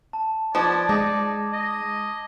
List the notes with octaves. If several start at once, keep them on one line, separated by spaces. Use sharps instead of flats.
A5
F3 B3 D#4 D5 G#6 E7
G#3 D#4 D6 D#6 A#6
D#5